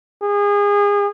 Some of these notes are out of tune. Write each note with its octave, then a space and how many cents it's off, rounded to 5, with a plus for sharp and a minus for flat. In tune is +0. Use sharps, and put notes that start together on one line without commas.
G#4 -30